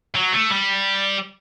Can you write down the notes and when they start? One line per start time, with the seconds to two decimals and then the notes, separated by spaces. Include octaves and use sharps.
0.16 F#3
0.32 A3
0.50 G3